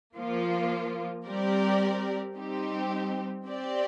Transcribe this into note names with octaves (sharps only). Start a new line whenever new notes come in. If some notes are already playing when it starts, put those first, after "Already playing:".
F3 A#3 F4
G3 C4 G4 A#4 D5
G3 C4 D#4 G4
C4 G4 D5